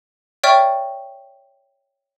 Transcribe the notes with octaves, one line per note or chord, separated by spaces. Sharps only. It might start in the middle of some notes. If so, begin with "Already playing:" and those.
C#5 D5 E5 G5 C#6 F6